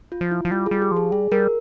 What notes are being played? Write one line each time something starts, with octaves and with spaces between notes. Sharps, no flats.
F4
F3
E4
F3
G3 F4
G#4
G3
G4
F3 G#4
G3 G#4
G3 A#4